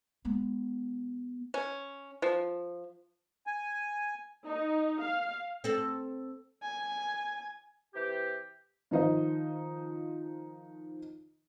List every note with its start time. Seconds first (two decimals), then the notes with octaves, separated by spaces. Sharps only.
0.25 G#3 B3
1.54 C#4
2.22 F3
3.47 G#5
4.46 D#4
5.03 F5
5.64 C4 A4
6.62 G#5
7.94 C3 E3 G4
8.91 D#3 F3 D#4 C5 D#5